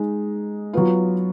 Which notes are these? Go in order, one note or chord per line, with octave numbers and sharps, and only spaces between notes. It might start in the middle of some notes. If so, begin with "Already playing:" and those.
Already playing: G#3 D#4
F#3 B3 F4